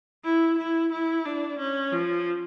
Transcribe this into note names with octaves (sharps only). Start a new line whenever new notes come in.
E4
E4
E4
D4
C#4
F3